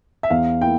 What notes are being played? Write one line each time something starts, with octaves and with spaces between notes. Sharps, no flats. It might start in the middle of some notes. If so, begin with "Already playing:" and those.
E5
E2 F5
A#3 E4 G5